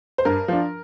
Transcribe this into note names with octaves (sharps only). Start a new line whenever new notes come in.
C5
G2 A#4
F3 D4